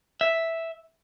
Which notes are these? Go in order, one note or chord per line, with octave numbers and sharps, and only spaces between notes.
E5